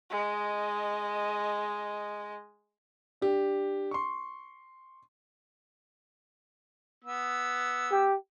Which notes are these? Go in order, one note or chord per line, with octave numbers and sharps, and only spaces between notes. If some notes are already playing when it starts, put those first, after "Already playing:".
G#3 D#5
D4 G4
C6 C#6
B3 E6
G4